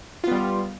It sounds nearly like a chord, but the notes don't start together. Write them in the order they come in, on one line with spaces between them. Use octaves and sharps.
F4 B3 G3